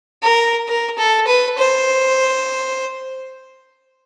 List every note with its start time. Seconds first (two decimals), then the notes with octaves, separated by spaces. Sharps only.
0.23 A#4
0.68 A#4
0.98 A4
1.27 B4
1.58 C5